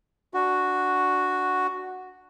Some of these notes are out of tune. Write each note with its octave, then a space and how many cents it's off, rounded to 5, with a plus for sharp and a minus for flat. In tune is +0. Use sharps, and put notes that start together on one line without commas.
D4 +0 F#4 +0